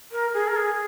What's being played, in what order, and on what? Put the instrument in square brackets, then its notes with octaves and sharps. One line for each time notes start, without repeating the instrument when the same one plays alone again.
[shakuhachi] A#4
G#4
A#4
G#4